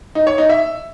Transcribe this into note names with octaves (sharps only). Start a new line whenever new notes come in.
D#4
C#5
D#4
E5